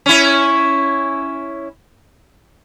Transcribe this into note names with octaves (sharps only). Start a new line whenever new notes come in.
C#4 E4